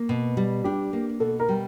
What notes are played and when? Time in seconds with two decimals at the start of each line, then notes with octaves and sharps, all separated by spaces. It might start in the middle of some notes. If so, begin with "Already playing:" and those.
Already playing: A#3
0.09 B2
0.37 G3
0.64 D4 G4
0.93 A#3
1.20 B2 A4
1.40 A#4
1.49 G3